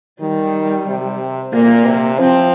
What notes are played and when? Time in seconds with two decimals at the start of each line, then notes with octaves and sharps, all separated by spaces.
0.21 D#3 G3
0.87 C3
1.53 A#2 A#3
1.86 C3
2.19 F3 C4